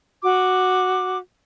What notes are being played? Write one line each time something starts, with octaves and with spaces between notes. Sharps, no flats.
F#4 D6